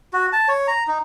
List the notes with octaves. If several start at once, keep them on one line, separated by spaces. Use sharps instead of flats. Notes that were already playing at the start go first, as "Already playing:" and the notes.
F#4
A5
C#5
A#5
D#4